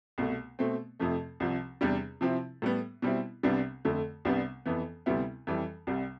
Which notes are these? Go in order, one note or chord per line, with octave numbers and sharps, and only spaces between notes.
C2 B2 A3
B2 A3 C4
F2 C3 F3 A3
C2 C3 F3
E2 C3 G3 D4
C3 F3 C4 E4
A2 G3 B3
B2 G3 C4 E4
C2 C3 G3 B3 D4
F2 D3 A3
C2 C3 G3 B3 D4
F2 E3 B3
D2 C3 G3 B3 E4
F2 E3 G3
C2 C3 G3